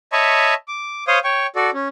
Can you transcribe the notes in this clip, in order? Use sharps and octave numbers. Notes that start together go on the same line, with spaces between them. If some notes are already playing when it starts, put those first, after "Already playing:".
C#5 D#5 E5 A5 B5 C#6
D6
C5 C#5 F5 D#6
C#5 G5 C#6
F#4 A4 D5
C#4